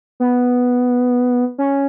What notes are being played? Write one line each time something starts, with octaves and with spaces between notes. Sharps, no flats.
B3
C#4